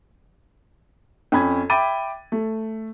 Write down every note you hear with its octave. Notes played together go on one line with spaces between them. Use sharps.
F2 C#4 B5 G#6
E5 G5 B5 D6 A6 D#7
A3